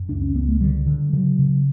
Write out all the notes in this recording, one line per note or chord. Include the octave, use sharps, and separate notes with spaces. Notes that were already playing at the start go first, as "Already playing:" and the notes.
Already playing: F#2
C#2 D4
C#4
C#2 B3
A3
D3 G3
D3
C#3 F#3
C#3